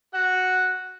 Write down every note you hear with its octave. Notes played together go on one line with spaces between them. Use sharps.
F#4 F#5